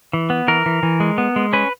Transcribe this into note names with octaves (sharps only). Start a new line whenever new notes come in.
E3
B3
E3 A#4
E3
E3
G#3
B3
G#3
C#4 B4